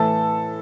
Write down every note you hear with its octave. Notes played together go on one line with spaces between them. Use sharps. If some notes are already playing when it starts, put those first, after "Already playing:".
Already playing: A2 E3 A4 A5